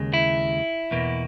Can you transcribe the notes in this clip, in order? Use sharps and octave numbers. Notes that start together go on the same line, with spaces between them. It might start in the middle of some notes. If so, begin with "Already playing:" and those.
Already playing: D#2 C#3 G#3
E4
E2 B2 A#3